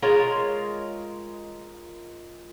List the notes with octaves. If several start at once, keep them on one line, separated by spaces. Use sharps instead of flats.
G#3 F4 A#4 C#5